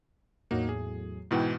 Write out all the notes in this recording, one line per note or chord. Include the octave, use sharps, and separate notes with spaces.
E2 A2 F#3 A#3 D#4 F#4
G#4
G#2 B2 E3 E4 F#5 G5